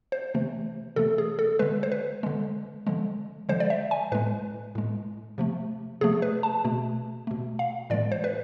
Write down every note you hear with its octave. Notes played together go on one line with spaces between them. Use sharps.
C5
C3 E3 A3
C3 E3 A3 A4
G#4
A4
D3 G#3 B4
C5
B4
D3 G#3
D3 F3 G#3
D3 F3 G#3 C5
D5
E5
G#5
A2 G#3 B4
A2 G#3
C3 F3 A3
C3 F3 A3 G#4
B4
A5
B2 A3
B2 A3
F5
A2 E3 G#3 D5
C5
B4